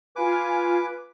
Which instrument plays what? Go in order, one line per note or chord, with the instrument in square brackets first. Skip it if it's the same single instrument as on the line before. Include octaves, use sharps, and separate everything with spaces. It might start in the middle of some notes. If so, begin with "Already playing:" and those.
[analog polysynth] F4 F5 G#5 [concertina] B4 D6